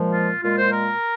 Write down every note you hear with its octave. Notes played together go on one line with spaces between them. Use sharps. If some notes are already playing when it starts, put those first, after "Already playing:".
Already playing: A#2 F3 G#3
F4
A#2 G#3 F4
C5
A#4